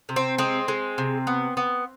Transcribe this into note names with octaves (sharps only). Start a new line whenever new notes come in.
C3
C4
G#3 C4
G#3
C3
B3
B3